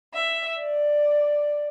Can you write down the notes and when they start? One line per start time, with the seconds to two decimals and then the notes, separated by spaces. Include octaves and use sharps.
0.13 E5
0.60 D5